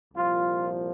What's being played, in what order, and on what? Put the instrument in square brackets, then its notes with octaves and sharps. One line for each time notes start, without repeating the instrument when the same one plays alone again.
[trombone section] C2 A#2 F3 F4